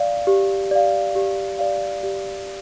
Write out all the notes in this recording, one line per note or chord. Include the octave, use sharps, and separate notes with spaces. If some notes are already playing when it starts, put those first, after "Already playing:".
Already playing: D5 F5
G4
D5 F5
G4
D5 F5
G4